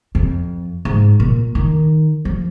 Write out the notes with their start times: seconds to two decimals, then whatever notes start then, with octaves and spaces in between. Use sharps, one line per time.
0.15 F2
0.85 G#2
1.20 A#2
1.55 D#3
2.25 F3